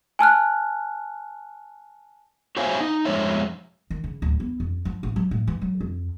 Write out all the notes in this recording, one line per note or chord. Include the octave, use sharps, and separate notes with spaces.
G#5 A5 F6 F#6
F#4 C5 C#5 E5 F5 G#5
D#4
F2 G#3 C#5 E5
D#3
C#3
D1
B3
F2
F3
A1
F#3
A2
E3
F#3
F2